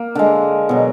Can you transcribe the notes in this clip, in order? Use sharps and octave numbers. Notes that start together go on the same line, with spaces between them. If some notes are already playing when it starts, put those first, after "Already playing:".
Already playing: A#3
D3 G#3
B2 F#3